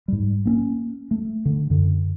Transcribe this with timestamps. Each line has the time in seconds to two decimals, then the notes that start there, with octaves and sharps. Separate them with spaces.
0.08 G#2 G3
0.45 A#3 C4 C#4
1.11 A3
1.45 D3
1.70 F#2 D3